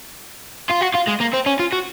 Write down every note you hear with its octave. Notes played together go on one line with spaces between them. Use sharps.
F4
F#4
F4
G#3
A#3
C4
C#4
F4
F#4